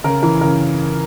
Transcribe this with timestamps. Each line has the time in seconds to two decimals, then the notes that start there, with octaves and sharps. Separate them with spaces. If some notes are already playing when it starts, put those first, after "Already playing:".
0.04 C#3 A#4
0.23 E3 A#4
0.41 C#3 A#4